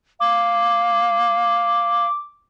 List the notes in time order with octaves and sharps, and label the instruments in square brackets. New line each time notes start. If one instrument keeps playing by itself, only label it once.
[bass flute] F5 [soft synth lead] D6